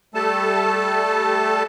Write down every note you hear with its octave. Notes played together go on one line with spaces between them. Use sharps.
G3 A3 A4 A5